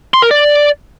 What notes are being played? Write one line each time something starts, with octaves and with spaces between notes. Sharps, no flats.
C6
A#4
D5